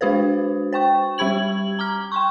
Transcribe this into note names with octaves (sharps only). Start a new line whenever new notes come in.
G#3 D4 F#4 B4 C5
C5 G5 C#6
G3 G4 B5 G#6 F#7
A#5 D6 F6
G5 C6 C#6